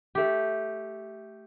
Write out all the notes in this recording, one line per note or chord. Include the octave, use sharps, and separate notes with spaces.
A3 G4